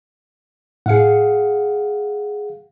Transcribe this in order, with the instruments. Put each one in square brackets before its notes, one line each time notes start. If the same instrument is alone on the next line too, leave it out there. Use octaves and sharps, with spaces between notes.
[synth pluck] A2 C#7 [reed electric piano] G#4 F5 F#5